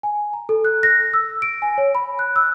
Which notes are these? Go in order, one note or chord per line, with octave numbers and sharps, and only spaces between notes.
G#5
A#5
A4
F#6
A#6
E6
D7
G#5
C#5
B5
F#6
E6